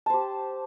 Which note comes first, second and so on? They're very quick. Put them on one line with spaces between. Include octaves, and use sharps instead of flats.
A5 C5 G4